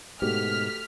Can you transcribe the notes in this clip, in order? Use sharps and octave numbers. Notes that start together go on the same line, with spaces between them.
G#2 B2 A3 F#4 G4 F6 B6